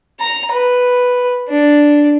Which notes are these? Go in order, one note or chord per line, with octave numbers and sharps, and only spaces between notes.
A#5
B4
D4